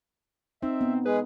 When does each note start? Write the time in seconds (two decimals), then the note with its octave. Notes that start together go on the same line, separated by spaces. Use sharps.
0.62 C4 D#4 E5
0.81 B3
1.06 G#3 G#4 B4